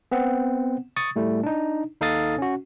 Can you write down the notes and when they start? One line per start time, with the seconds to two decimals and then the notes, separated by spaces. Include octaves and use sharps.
0.12 B3 C4 F#5
0.96 C#6 D#6 A6
1.16 A2 G3 A3
1.43 D4 D#4
2.01 D#2 D#4 A4 F5 D#6 A6
2.38 C#4 F#4